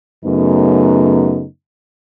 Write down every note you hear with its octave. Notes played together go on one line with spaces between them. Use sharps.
F#2 C#3 A3 B3 D#4